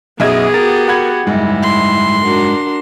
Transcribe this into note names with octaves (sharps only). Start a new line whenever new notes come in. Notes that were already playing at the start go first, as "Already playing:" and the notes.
B1 F#2 B3 G#4 D#5 E5 G#6
F#4 G4 A#4 A6
F#5 B5 G#6
F#1 G#2 G3 E4
C6
D4 F#4 A#4